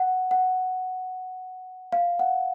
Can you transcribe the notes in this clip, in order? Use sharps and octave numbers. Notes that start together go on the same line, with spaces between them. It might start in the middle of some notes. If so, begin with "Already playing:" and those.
Already playing: F#5
F#5
F5
F#5